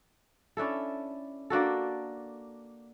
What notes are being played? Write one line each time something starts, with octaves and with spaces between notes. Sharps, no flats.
C#4 D4 E4 A4
A#3 D4 F#4 A4